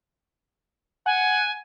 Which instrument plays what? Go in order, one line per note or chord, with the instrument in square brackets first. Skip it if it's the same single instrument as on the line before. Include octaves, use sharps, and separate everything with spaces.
[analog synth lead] F#5 [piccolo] G#5